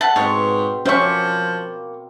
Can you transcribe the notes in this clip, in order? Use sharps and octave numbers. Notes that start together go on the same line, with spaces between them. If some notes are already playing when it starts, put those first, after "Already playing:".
E5 F#5 A5
G#2 B2 C4 C#5
F3 A#3 C#4 C5 E5 C#6